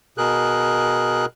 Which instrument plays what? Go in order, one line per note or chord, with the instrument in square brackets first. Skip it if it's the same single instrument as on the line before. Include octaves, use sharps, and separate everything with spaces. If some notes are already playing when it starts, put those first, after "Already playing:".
[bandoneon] B2 G#4 A#4 F#6